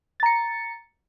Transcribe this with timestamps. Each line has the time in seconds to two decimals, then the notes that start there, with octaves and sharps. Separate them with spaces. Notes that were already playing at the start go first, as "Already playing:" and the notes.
0.20 A6
0.23 A#5
0.26 C#7